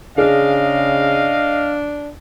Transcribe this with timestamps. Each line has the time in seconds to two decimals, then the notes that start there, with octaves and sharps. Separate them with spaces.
0.18 C#3 D4 G#4 D#5 F5